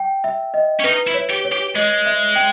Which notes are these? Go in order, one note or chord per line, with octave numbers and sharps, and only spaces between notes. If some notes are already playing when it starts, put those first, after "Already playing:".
Already playing: G5
E5
D#5
C#4
D#4 B4
E4
C#5
G4
C#5
G4
G#3 D#5
E5
G5